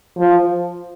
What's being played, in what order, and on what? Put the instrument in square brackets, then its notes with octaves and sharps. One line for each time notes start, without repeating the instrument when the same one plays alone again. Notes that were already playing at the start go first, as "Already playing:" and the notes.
[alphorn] F3